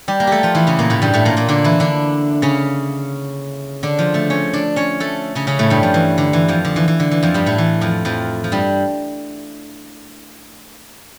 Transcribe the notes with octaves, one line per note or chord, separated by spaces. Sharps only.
G3 G4
A#3 A#4
A3 G4 A4
F3 F4
E3 E4
C#3 C#4
A#2 A#3
A2 A3
G2 G3
A2 A3
A#2 A#3
A#2 A#3
D3 D4
E3 E4
D3 D4
C#3 C#4
D3 D4
F3 F4
A3 A4
C#4 C#5
D4 D5
C#4 C#5
A3 A4
C#3 C#4
C#3 C#4
A2 A3
G2 G3
F3
E3
D3
E3
F2 F3
D3
E3
E3
D3
E3
F2 F3
G2 G3
A2 A3
E3
F2 F3
F2 F3
F3
G2 G3